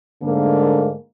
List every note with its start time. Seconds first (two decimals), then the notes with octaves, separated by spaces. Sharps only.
0.23 G#2 D3 A3 A#3